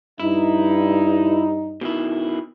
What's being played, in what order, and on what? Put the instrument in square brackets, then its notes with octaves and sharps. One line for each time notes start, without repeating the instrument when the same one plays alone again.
[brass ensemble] G2 D#4 [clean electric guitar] E4
[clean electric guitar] B2 D#3 E4